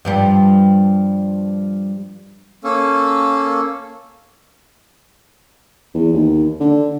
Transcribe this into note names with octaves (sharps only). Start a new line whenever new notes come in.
G2 F3 G3
A#3 C#4 A4
E2
D#2
D3